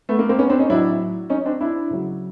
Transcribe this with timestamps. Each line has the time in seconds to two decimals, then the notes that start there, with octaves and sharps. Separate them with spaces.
0.09 A3 B3
0.19 A#3
0.29 A#3 C4
0.39 B3 C#4
0.49 C4 D4
0.59 C#4 D#4
0.70 A2 F#3 D4 E4
1.30 C#4 D#4
1.45 C4 D4
1.61 D4 E4
1.90 C#3 F#3